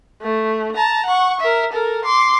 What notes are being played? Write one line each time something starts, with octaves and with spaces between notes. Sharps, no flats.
A3
A5 A#5
F#5 C#6
A#4 E5
A4 A#4
C6 D6